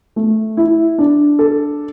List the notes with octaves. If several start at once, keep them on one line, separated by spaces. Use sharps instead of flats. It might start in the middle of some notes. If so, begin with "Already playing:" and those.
A3
E4
D4
A4